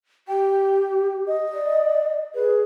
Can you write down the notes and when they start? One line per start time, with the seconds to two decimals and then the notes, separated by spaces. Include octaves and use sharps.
0.28 G4 G5
1.27 D#5
1.53 D5
2.34 G#4 B4